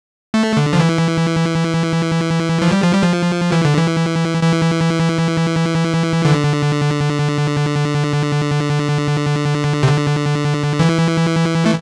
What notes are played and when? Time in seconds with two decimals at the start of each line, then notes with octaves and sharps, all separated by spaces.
0.34 A3
0.57 D3
0.73 F3
0.80 E3
2.62 F3
2.72 G3
2.83 F3
2.93 G3
3.04 F3
3.52 E3
3.65 D3
3.78 E3
4.43 E3
6.25 D3
9.83 C3
9.88 D3
10.80 E3
11.66 A3